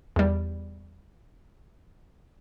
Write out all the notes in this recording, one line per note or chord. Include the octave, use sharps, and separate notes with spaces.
E2 G3